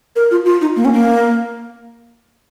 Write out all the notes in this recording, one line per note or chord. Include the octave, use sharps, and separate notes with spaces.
A#4
F4
F4
D#4
A#3
C#4
A#3